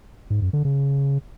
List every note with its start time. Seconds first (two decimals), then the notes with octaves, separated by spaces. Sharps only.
0.30 G#2
0.42 F#2
0.53 D3
0.65 C#3